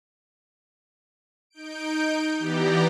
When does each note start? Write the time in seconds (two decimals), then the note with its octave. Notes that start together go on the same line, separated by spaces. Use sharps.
1.50 D#4 G6 D7
2.39 E3 B3 G4 D5 A#5